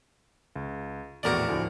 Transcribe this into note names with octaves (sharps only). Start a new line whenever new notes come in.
C#2
A#1 E2 A2 F#4 A#4 D5
D2 A2 F3